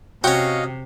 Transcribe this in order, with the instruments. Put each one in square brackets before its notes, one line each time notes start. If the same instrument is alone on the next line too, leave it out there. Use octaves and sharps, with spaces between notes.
[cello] C3 [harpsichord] C#4 F#4 [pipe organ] D#5 F5 [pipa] G5